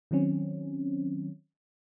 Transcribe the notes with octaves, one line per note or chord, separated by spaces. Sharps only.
D#3 F#3 C4 C#4